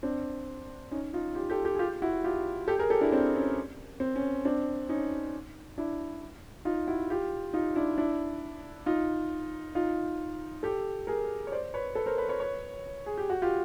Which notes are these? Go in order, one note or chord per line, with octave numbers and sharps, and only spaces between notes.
C4 D4
C#4 D#4
D#4 F4
F4 G4
G4 A4
G4 A4
G#4
F4 G4
E4 F#4
F4 G4
G4 A4
G#4 A#4
G4 A4
D4 E4
C4 D4
C#4
C4
C#4
C4 D4
C#4 D#4
D4 E4
D#4 F4
E4 F#4
F4 G4
D#4 F4
D4 E4
D4 E4
D#4 F4
D#4 F4
G4 A4
G#4 A#4
C#5
C5 D5
B4 C#5
A4 B4
A#4 C5
B4 C#5
B4 C#5
B4 C#5
G#4
G4
F#4
F4 G4